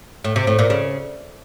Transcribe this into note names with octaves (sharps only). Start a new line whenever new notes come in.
A2
C3
A2
A#2
C#3